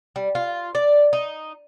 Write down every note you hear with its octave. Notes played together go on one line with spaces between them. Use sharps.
G3
F4
D5
D#4